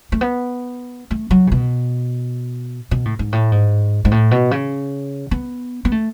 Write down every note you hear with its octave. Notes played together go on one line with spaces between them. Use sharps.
A3
B3
A3
F#3
C#3
B2
B2
A2
G#2
A2
G#2
G#2
A2
B2
C#3
B3
B3
A3